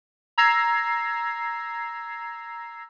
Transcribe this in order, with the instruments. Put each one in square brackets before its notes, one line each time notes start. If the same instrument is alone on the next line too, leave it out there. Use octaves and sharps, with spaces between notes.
[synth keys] A#5 E6 G#6 A#6 C7